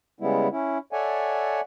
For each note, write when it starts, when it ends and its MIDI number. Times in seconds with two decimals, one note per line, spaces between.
0.20 0.48 49
0.20 0.48 55
0.20 0.48 56
0.20 0.48 59
0.20 0.48 64
0.52 0.78 61
0.52 0.78 64
0.93 1.61 69
0.93 1.61 73
0.93 1.61 74
0.93 1.61 76
0.93 1.61 78
0.93 1.61 80